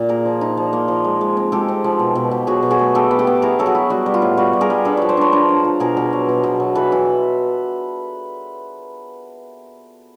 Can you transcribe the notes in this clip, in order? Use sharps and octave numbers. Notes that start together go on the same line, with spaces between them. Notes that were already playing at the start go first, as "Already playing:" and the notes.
Already playing: A#2
A#3 G#4 A#4
F3
D#4
F3
A#3
F3
G#3
G#3
C4
G#3 G4 A4
C4
F3
B2
B2
B2
F#3 F#4 G#4
B2
F#4 G#4
A3
B3 G4 A4
B3
G4 A4
B3
E4 G#4 A#4
F#3 A4
F#4 G#4
E4
G3 F#4
G3
F4
A2
G3 F#4
G3
G#4 A#4
G3
D4 A4 B4
F3 B4 C#5
C5 D5
D4 B4 C#5
D4 A#4 C5
D4
F3
B2 G#4 A#4
B2
F#3
B2
B2
F#3
E3 A4 B4
E3